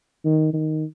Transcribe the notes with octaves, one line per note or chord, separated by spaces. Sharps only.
D#3
D#3